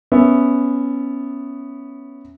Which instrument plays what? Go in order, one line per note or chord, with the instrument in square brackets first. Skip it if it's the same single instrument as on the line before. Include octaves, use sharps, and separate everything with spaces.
[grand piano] B3 C#4 E5